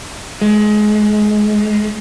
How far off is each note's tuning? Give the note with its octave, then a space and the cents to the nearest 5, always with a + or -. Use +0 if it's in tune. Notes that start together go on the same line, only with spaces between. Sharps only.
G#3 +25